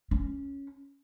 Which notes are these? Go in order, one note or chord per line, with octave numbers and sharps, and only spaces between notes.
C#4